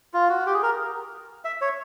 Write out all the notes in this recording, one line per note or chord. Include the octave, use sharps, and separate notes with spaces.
F4
F#4
G4
G#4
A#4
E5
C#5